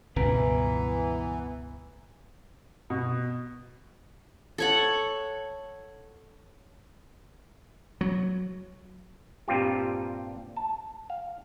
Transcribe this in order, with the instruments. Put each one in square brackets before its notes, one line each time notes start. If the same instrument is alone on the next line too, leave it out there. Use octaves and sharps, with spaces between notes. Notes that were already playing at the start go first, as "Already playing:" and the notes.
[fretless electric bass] C#2 G2 B2 [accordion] E3 [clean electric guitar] B3 B4 A#5
[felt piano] B2
[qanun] A4 C#5 F#5
[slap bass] F#3
[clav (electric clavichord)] G2 A#2 G3 C4 F4 G4
A5
F5